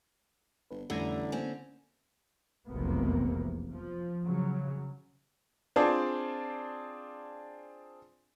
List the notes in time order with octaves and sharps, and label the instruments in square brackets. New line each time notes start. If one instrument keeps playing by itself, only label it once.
[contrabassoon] G1 [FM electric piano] B4
[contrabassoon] A1 [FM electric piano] F2 A3 E6 [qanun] D3 G#5 A#5 [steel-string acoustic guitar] G3
[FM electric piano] A#3 [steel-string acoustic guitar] C4 C#4
[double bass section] F1 B1 E2 C3 A#3 B3
F3
C#3 F#3
[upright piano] C4 D4 F4 G#4 D5 A5